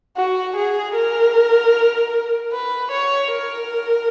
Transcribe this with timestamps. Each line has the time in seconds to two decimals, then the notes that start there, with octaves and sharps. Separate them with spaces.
0.17 F#4
0.56 G#4
0.95 A#4
2.52 B4
2.92 C#5
3.31 A#4